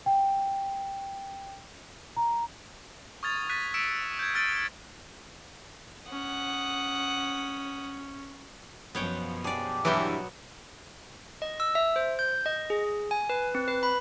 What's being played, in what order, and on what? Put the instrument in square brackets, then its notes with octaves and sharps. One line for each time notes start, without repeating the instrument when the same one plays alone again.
[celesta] G5
A#5
[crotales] C#6 D#6 F6 G#6 A6 F7
F#6 A6 B6 D#7
E6 B6 C#7 D7 E7
E6
G6 G#6
E6 F6 A6 D7 D#7 G7
[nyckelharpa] C#4 [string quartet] F#5 D#6
[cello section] F#2 B2 F3 [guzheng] B3 C#5 G5
[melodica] D4 G4 [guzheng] G#4 D5
[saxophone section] G2 E3 [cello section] B2 [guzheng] F#3 B3 G5
[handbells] D#5
E6
E5
C5
G6
D#5
G#4
G#5
B4
C4
B4
B5